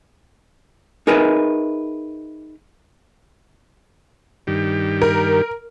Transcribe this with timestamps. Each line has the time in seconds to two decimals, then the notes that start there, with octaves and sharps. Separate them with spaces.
1.07 D#4 G#4 A#4 B4 D#5 E5
4.47 G2 D#3 G4
5.02 A#4